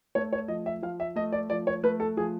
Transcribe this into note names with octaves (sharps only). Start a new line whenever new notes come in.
A3 C#5
C#5
F3 D#5
E5
F3 F5
E5
A3 D#5
D5
F3 D5
C#5
A3 B4
A4
F3 G#4